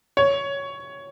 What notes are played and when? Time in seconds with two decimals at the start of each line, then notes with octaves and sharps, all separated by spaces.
0.17 C#5